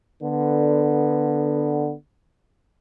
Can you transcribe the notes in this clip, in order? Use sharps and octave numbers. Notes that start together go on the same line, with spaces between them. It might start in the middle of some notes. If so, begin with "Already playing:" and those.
D3 B3